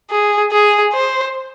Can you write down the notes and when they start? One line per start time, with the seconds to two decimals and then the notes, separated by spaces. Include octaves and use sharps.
0.11 G#4
0.52 G#4
0.94 C5